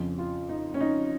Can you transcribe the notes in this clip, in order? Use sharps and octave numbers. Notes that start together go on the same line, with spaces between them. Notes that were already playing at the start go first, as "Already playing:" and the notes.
Already playing: F2 C#3 F3
F4
D#4
C#4
D#4